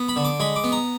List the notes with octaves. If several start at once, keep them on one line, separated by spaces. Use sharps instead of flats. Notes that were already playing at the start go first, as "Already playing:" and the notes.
Already playing: B3
B5
D3
D6
G#3 B5
D6
B3
A#5